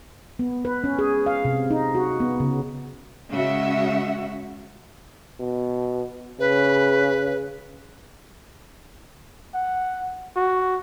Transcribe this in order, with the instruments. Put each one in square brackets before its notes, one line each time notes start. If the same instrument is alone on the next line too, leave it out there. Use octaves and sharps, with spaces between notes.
[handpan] B3
B4
C#4
G#4
F5
C3
D#4
F#4
B3
C#3
[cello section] C#3 G#3 F#4 E5
[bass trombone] B2
[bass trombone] C#3 [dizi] B4
[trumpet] F#5
F#4